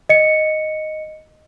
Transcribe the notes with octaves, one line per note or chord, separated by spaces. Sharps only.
D#5 C#7